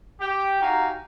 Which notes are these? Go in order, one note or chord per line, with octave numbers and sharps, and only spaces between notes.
G4
D#4 F#4 G4 F5 G#5 A#5